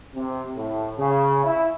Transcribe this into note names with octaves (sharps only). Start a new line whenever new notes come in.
C3
A2
C#3
E4